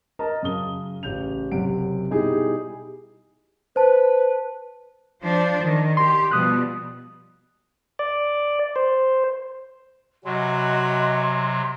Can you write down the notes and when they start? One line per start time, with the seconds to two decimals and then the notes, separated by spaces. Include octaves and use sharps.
0.19 A#4 D#5 A5 A#5
0.43 F#2 C#3 D#6 G7
1.03 A1 C#3 G6 F7
1.52 F#1 F#2 C3 F#5 D7
2.10 B2 G3 D#4 E4 G4 G#4
3.76 B4 C5 A5
5.22 F3 D4 C5
5.62 D#3
5.97 G4 C6
6.31 B2 F3 G3 D#6 F#6
7.99 D5
8.76 C5
10.25 C3 F#3 F#4 D#5 G#5 B5 C6